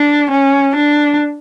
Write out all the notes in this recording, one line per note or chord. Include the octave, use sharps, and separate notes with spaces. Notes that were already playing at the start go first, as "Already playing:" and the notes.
Already playing: D4
C#4
D4